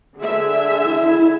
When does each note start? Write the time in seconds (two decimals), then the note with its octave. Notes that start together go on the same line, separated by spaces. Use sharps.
0.18 D3 G#4 E5
0.84 E4